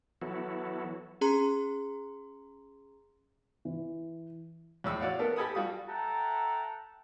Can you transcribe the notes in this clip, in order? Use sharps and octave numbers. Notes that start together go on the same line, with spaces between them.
E3 F#3 B3 E4 F#4 A4
C#4 G#4 A#5 C6
E3
E2 A2 E6
F#4 C#5 D5 F5 F#5
A#3 B3 A4 A#4
G4 A4 G#5 B5 D#6
G3 F4 F#4 D#6
A4 E5 F#5 G5 A5 A#5